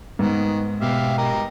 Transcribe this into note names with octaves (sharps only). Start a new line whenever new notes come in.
G#2 D#3 B3
B2 G4 E5 F5
G4 A#4 D#5